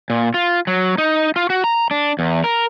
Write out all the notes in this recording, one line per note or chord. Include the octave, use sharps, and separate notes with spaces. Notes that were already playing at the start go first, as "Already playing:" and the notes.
A#2
F4
F#3
D#4
F4
F#4
A#5
D4
E2
A#4